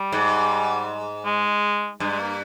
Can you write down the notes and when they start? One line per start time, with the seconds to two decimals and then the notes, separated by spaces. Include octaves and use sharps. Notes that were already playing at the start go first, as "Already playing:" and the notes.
Already playing: G3
0.12 G#2
1.25 G#3
2.00 G2 G#3
2.11 G#3
2.20 A#3